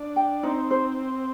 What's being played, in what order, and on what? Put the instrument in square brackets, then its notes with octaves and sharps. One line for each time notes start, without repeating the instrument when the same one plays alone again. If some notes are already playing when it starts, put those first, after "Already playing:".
Already playing: [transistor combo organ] D4
[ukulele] G5
[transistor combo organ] C4 [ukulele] D#4
[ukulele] C5